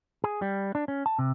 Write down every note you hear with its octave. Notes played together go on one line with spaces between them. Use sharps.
G#4
G3
D4
C#4
A5
C3